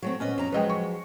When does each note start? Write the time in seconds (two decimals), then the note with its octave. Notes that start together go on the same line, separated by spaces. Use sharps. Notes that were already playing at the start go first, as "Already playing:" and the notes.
0.02 F#3 A3 C4
0.20 A#2 B3 C#4 D#5
0.38 F2 A#5
0.52 F3 F#3 G#3 B4 D#5 G5
0.70 C#6